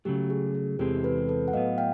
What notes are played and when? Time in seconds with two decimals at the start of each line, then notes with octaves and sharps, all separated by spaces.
0.05 C#3 F#3 A3 G4
0.30 G#4
0.54 G#4
0.79 E2 C3 E3 G#3 C4 G4 A4
1.04 A4 B4
1.29 A4 B4
1.48 F#5
1.53 A2 F#3 B3 D#5 F5
1.78 F5 G5